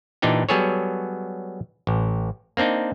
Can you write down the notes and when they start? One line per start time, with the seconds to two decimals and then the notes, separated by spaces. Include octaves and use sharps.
0.22 A#2 E3 D4 D#4 G4
0.49 F#3 G3 B3 G#4 A4 C#5
1.87 A1
2.57 A#3 C4 D4 D#4